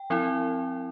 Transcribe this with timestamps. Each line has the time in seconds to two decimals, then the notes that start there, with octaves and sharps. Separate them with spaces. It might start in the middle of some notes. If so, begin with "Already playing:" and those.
Already playing: G5
0.10 F3 C4 E4